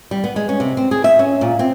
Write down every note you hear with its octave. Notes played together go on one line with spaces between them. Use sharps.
G3
B3
G#3
C#4
C3
C4
G#4
E5
C#4
A#2
C4